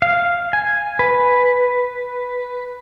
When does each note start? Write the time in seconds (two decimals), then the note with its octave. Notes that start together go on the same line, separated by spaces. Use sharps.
0.02 F5
0.53 G#5
0.99 B4